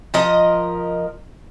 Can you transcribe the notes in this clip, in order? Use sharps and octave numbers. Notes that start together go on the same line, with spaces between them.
F3 A#4 D#5